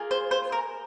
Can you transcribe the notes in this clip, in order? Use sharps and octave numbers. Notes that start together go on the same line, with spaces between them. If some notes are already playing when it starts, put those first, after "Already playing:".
Already playing: A#3 F4 G#4
C5
C5
A#4